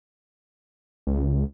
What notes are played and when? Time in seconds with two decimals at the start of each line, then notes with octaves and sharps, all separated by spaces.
1.07 C#2